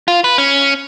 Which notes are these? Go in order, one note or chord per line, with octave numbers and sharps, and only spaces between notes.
F4
B4
C#4